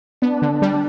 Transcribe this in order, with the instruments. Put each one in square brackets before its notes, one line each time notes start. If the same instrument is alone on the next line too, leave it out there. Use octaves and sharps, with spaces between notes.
[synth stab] B3 [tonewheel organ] D4
[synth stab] D3
G3